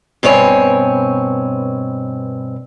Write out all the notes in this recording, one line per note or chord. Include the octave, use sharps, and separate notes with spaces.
G2 B2 C4 C#5 G#5